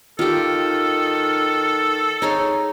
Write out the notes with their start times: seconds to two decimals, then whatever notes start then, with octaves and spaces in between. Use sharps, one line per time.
0.19 D#3 F4 G4 A4
2.22 D#4 G#4 C#5